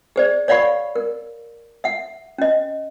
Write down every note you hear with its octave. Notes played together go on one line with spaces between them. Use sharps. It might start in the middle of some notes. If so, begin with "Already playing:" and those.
G#4 C5 D5
C#5 D5 F5 F#5 B5 C#6
A#4
E5 F#5
C#4 D#5